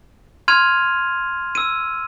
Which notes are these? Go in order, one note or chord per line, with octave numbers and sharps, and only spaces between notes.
C6 F6 G#6 D#7 F7
E6 D#7